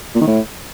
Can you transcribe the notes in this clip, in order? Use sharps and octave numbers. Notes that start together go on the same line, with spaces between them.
A#2
D#3
A2